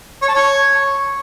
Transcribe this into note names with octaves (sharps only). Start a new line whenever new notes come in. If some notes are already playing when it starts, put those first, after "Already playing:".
C#5
A5
C#5